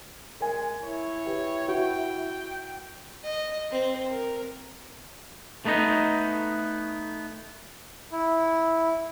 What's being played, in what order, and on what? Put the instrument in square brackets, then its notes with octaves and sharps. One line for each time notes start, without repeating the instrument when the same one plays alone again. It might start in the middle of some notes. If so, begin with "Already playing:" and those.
[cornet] G#3 [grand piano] A#4 G#5
[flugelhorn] E4 [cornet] C#5
[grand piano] G4 B4
[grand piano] F#4 [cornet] G5
[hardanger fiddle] D#5
C4
A#4
[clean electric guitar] A3 B3 D#4 D#5
[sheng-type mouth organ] E4